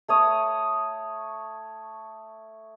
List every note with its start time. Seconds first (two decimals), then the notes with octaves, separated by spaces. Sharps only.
0.08 A3 C#5 D#6